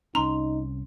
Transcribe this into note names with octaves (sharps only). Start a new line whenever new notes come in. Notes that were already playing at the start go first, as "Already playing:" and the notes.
C2 C#4 D#4 A#5 C6